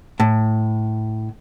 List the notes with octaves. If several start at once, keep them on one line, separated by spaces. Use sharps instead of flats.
A2